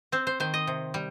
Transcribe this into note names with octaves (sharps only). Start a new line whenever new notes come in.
C4 C5
C5
D#3 C5
D#5
C3
G3